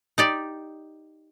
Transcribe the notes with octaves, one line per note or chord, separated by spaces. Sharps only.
D#4 G4 D5